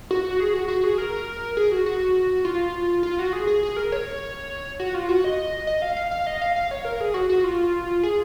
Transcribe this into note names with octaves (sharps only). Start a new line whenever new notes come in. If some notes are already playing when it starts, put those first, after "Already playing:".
F#4
G#4
F#4
F#4
G#4
A#4
G#4
F#4
F#4
F4
F4
F#4
G#4
G#4
G#4
A#4
C#5
F#4
F4
F#4
D#5
D#5
F5
F5
F5
D#5
F5
F5
C#5
A#4
G#4
F#4
F#4
F4
G#4